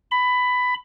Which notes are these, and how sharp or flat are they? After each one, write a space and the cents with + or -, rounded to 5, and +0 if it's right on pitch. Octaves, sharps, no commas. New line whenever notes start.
B5 +15